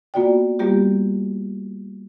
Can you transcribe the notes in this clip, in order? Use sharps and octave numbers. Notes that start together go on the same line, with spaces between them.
A#3 B3 F4 F#4 D5 G5
G3 A#3 B3 F4 G4